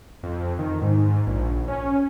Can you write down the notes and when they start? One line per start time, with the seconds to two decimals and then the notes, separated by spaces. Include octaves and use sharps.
0.23 F2
0.59 D#3
0.82 G#2
1.27 A#1
1.68 C#4